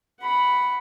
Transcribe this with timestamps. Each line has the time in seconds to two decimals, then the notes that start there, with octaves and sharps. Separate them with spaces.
0.21 F#5 B5